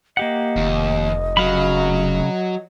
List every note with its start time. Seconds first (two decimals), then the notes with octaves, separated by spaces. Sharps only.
0.17 A#3 G4 D#5 F#5
0.56 F1 D#2
1.37 C#3 F#3 F5 B5